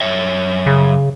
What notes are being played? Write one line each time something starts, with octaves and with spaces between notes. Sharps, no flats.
F#2 C#5 E5
C#3